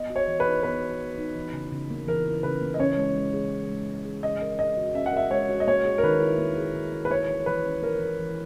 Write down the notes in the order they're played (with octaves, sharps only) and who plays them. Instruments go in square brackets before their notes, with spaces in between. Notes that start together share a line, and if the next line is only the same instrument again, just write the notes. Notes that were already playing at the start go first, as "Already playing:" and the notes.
Already playing: [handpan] B3 [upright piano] D#5
[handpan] F#4
[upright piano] C#5
[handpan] E3
[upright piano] B4
[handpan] D#4
[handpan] B3 [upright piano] B4
[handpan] F#4
E3
D#4
E3
C#3
C#3
A#3
[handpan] E3 [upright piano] A#4
[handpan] C#3
[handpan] C#3 [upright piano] B4
[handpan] A#3
[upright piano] D#5
[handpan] C#4 [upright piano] C#5
[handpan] G#3
G#3
G#4
C#4
G#3
G#3
G#4
[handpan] C#4 [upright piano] D#5
[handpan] A#4
[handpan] G#3 [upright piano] D#5
[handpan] F#4
[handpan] C#4 [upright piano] E5
[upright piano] F#5
[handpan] A#4 [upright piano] E5
[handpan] G#3 [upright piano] C#5
[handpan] F#4
[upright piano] D#5
[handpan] A#3 [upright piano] C#5
[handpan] G#4
[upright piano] A#4
[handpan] D#3 [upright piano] B4
[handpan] E4
A#3
G#4
D#3
E4
[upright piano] B4
[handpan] A#3 [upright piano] C#5
[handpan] E3
[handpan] E3 [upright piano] B4
[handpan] C#4
[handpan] A#3 [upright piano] A#4
[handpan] E3
E3